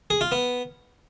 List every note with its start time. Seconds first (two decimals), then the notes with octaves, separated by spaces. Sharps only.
0.10 G#4
0.21 F4
0.32 B3